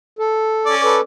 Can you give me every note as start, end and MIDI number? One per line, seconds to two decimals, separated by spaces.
0.19 0.75 69
0.66 0.98 61
0.66 0.98 74
0.84 1.01 69
0.84 1.01 71